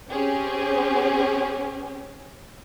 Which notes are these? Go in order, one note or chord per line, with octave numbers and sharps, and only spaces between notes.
C4 C#4 G4 G#4